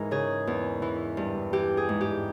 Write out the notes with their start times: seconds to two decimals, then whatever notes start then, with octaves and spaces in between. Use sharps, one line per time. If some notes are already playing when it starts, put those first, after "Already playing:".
Already playing: G#2 E3 A#4
0.11 C#3 G#4
0.47 E2
0.82 E3
1.17 G2
1.53 E3 G4
1.77 G#4
1.89 G#2
2.01 G4